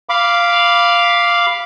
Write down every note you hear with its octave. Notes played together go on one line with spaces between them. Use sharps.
F5 B5 D6